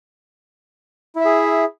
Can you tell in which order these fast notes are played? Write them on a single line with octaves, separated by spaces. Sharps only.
E4 E5 G#4